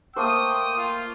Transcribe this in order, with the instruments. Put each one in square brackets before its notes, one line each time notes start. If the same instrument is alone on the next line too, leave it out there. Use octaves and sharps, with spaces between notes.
[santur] A3 A#3 C5 [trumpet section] G5 D#6
[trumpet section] F4